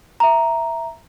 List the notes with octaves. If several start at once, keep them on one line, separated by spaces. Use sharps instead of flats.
E5 A#5